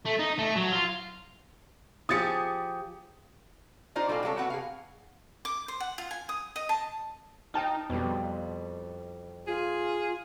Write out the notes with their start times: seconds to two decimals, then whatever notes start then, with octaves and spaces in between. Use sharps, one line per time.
0.05 A3
0.19 D#4
0.39 A3
0.56 F#3
0.72 F4
2.09 F3 G4 G#4 D#6 A6 C#7
3.95 D#4 F4 G#4 C5 D5 D#5
4.08 B2 G3 A4 C5 F5 G#5
4.23 C3 G#3 F#4 A4 C#5
4.37 C3 B3 F#4 F#5
4.50 G#4 F5
5.45 D6
5.68 C5
5.80 F#5
5.98 F4
6.11 G#5
6.29 D#6
6.56 D#5
6.69 A5
7.54 D#4 G5 A5 F6
7.90 F2 B2 G3
9.47 F4 G#4